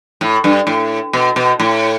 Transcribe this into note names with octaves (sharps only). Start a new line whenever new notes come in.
A2
G2
A2
B2
B2
A2